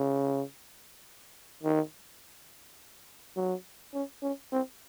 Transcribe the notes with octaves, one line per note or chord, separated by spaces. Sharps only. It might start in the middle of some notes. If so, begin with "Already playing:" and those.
Already playing: C#3
D#3
F#3
C#4
C#4
C4